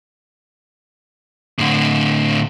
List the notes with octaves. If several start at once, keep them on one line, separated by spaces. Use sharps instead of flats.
A2 D3